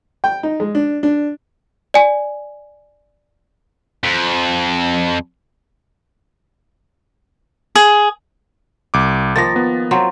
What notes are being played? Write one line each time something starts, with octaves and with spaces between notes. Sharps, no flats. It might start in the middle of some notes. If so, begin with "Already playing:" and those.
G5
D#4
G#3
D4
D4
D5 G#5
F2
G#4
C2 D6
D#3 F3 A#3 A6 A#6
B3
F#3 C4 F4